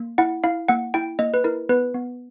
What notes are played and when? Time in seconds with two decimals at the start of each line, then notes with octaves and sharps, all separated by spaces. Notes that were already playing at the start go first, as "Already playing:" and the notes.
Already playing: A#3
0.18 E4 F#5
0.44 E4 F5
0.68 A#3 F#5
0.94 E4 G5
1.19 A#3 D#5
1.34 B4
1.44 E4 A#4
1.69 B3 B4
1.95 B3